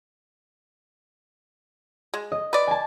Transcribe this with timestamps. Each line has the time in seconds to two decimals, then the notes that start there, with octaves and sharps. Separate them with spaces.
2.14 G#3
2.32 D#5
2.53 B4 D5
2.67 G#5 A5